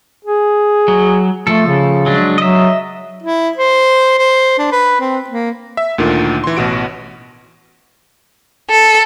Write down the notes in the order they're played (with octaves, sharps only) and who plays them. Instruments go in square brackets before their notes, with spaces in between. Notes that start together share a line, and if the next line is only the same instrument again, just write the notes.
[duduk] G#4
[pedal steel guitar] F#3
[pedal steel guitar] F3 A4 [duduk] A3
[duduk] C#3
[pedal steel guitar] F#3 G#3 D4
[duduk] F#3 [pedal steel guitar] D#5 E5
[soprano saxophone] E4
C5
C5
D4
B4
C4
A#3
[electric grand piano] E5
D2 A#2 D3 D#3
E3 C6
A1 B2 F#4 D7
[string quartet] A4